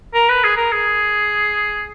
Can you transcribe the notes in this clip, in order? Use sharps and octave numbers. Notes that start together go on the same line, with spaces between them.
A#4
B4
G#4
A#4
G#4